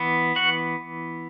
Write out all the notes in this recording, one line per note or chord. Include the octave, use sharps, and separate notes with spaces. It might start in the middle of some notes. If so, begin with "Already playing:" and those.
Already playing: E3 B3
F#4 F#5